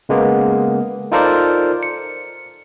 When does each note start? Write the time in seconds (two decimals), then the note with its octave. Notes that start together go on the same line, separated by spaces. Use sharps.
0.09 C#3 G#3 A#3 B3
1.12 D#4 F4 A4 A#4 C5 D5
1.83 C#7